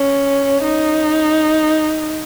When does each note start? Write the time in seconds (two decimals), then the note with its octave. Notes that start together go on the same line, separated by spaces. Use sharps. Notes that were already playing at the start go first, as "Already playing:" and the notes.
Already playing: C#4
0.63 D#4